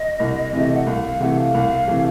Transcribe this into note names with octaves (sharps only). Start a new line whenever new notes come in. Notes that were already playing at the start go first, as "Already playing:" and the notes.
Already playing: D#5
C2
C3 E3 A3
F#5
C2 F5
F5
C3 E3 A3 F#5
F5
C2
C3 E3 A3